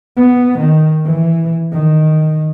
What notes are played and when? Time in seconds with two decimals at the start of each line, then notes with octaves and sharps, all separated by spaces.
0.17 B3
0.59 D#3
1.06 E3
1.73 D#3